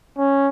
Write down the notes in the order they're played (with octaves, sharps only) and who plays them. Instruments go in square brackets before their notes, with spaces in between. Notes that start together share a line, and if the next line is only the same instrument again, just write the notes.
[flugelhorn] C#4